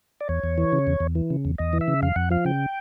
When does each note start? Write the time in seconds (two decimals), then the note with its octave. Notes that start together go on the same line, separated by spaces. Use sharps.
0.21 D5
0.29 E2 C#5
0.44 E2
0.58 E3
0.72 C#3
0.87 E2
1.00 E2
1.15 E3
1.30 C#3
1.45 E2
1.58 E2 D#5
1.73 E3
1.81 E5
1.88 C#3
2.02 F2 F5
2.16 F2 F#5
2.30 F3 F5
2.45 C#3 G5